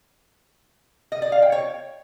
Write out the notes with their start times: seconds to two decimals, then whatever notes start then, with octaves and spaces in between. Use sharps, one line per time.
1.12 D#5
1.22 D5
1.32 F5
1.42 G5
1.52 C#5